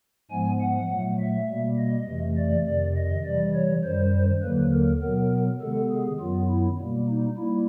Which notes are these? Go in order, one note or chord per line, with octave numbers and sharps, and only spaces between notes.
G#2 F3 G#3 B3 G#5
F#5
A#2 F#3 A3
E5
B2 G3 A#3
D#5
F2 C3 E3 A3
D5
F2 C3 D#3 D5
D#5
C3 E3 G3 D5
C#5
F#2 D#3 G3 C5
D#2 D3 F#3 A#3 B4
A#4
B2 F#3 B3 A#4
C3 D#3 G#3 B3 A4
G#4
F#2 D#3 F#3 B3 F4
E4
B2 G3 A#3
D#4
G3 A#3 E4